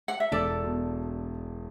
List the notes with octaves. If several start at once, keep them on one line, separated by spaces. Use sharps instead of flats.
F#5
E5
E1 A4 D5
B2